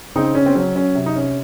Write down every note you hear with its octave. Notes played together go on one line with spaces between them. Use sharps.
C#3 C4 D#4
C#4
C4
F#3 C#4
C#4
C3
D#4
C#4